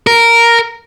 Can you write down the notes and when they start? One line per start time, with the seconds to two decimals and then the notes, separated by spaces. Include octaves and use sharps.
0.07 A#4